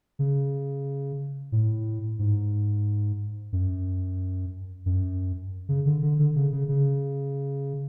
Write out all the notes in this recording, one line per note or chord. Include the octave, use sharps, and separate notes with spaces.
C#3
A2
G#2
F#2
F#2
C#3
D3
D3
D3
C#3
C#3
C#3